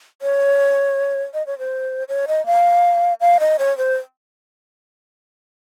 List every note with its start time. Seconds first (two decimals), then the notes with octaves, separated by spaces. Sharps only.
0.22 C#5
1.34 D#5
1.47 C#5
1.59 C5
2.09 C#5
2.28 D#5
2.46 F5
3.21 F5
3.40 D#5
3.59 C#5
3.78 C5